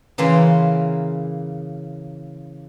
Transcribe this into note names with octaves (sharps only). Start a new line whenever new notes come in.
C#3 E3 A#3 C6